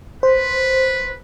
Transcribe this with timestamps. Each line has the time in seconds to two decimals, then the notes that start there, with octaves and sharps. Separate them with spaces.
0.23 B4 C5